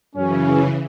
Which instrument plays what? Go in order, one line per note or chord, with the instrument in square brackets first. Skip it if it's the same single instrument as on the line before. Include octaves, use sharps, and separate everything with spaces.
[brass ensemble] F#2 C#4 [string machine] C#3 E3